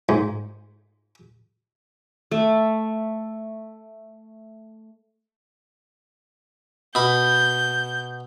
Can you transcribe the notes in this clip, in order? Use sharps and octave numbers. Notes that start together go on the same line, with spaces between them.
G#2
A3 A5
B2 B5 G6